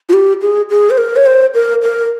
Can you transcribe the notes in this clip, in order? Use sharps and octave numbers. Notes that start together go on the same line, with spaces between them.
F4
G4
G#4
G#4
C5
A#4
C#5
C5
A#4
A#4